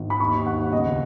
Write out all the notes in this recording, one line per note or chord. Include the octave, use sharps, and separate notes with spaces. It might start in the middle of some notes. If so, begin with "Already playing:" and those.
Already playing: G#1
B5
D#2 C#6
D#2 F#5
C#2 D#5